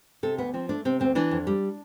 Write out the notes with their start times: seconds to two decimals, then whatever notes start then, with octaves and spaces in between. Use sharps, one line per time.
0.23 C3 A4
0.38 D2 B3
0.54 F3 C4
0.69 A3 D4
0.85 C3 C4
1.00 D2 C4
1.15 E3 D4
1.31 F2
1.47 G3